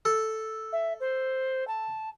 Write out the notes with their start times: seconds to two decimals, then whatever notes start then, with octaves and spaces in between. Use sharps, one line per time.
0.05 A4
0.72 E5
1.00 C5
1.67 A5